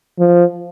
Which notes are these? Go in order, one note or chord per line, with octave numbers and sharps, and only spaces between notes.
F3